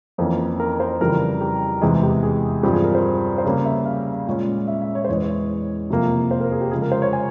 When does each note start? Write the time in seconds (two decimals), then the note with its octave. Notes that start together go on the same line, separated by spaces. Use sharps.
0.18 F2 E3 A#3 C#4 C5
0.60 A#4
0.80 C5
1.00 F2 C#3 E3 G3 A#4
1.41 G4
1.81 E2 C3 E3 G#3 G#4
2.03 G4
2.23 G#4
2.63 G2 F3 C4 G4
2.73 G#4
2.84 A#4
2.95 C5
3.38 C5
3.45 C#3 G3 A#3 C#4 C#5
3.65 E5
3.85 F5
4.27 A#2 G#3 C#4
4.68 E5
4.82 E5
4.95 C#5
5.05 C5
5.09 E2 E3 G#3 C#5
5.90 F2 C3 F3 A#3
6.31 C5
6.40 A#4
6.52 G#4
6.61 G4
6.71 C#3 F3 G#3 G#4
6.82 A#4
6.92 C5
7.02 C#5
7.13 G#5